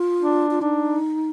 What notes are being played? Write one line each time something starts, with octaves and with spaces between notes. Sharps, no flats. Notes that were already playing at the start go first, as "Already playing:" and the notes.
Already playing: F4
D4
F4
D4 D#4